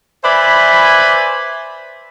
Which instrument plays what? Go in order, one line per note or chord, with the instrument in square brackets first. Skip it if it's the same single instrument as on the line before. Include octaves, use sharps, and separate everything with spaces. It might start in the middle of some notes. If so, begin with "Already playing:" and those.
[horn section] B4 C5 D5 E5 G#5 B5